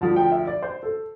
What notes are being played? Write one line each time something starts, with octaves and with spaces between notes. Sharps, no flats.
D2 D3 F3 A5
G5
E5
D5
C5
A4